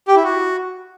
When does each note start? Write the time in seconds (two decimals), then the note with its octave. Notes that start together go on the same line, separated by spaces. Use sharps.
0.08 G4
0.16 E4
0.24 F#4